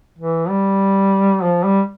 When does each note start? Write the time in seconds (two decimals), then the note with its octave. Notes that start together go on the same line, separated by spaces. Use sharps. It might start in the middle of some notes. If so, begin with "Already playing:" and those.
0.18 E3
0.49 G3
1.43 F3
1.64 G3